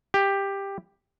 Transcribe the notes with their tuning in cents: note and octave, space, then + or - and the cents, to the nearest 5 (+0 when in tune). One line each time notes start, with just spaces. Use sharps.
G4 +10